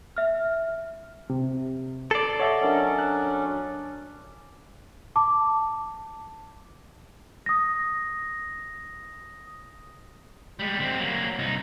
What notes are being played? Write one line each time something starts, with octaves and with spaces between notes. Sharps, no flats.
E5 F6
C3
A4 D5 C7
C#5 D#5 E5 F#5 A5 E6
F#3 C#4 D4 A#4 D#5
F#6
A5 D6
D#6 A#6
G3 G#3
D3 C4
F#3 A#3
C2 D#4